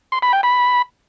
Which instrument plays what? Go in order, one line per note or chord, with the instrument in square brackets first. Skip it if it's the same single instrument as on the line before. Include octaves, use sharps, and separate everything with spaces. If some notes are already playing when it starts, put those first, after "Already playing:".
[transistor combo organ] C6
B5
G5
B5